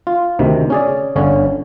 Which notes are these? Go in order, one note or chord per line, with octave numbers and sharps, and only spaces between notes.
F4
D2 C3 D#3
C#4 G#4 D5
G1 D3 C#4 C#5